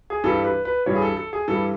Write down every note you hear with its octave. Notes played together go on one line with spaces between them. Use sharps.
G#4
G2 E3 G3 A4
B4
B4
G2 E3 G3 C#5
G#4
A4
A4
G#4
G2 E3 G3 A4